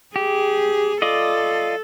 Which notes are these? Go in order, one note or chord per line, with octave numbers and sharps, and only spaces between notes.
G4 G#4
F4 A4 D5 D#5